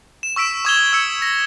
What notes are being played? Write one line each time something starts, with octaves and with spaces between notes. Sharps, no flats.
E7
C#6 E6 B6 D7 E7
C#6 D#6 G#6 E7 F7 G7
E6 C#7
A#6